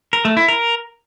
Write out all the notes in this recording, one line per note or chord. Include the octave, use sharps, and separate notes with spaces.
A#4
A3
E4
A#4